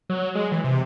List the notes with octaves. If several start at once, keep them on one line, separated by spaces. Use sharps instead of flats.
F#3
G#3
E3
C3